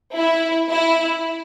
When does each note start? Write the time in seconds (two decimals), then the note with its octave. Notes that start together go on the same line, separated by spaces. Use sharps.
0.16 E4
0.69 E4